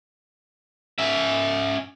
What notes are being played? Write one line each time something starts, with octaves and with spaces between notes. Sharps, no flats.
C#4 E5